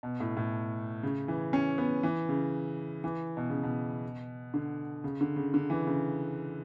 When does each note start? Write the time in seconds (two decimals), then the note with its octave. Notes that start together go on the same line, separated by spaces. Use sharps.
0.03 B2
0.20 A2
0.37 A2
1.03 C#3
1.28 E3
1.53 C#4
1.78 B3
2.03 E3
2.29 C#3
3.04 E3
3.37 B2
3.50 C#3
3.63 B2
4.54 D3
5.04 C#3
5.21 D3
5.36 C#3
5.54 D3
5.70 E3
5.87 C#3